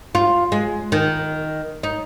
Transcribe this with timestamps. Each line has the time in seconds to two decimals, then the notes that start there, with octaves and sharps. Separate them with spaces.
0.15 F4
0.52 G#3
0.92 D#3
1.83 D#4